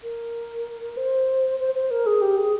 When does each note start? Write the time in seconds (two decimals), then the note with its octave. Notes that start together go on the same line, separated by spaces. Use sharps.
0.03 A#4
0.97 C5
1.60 C5
1.74 C5
1.91 A#4
2.06 G#4
2.22 G4
2.37 G#4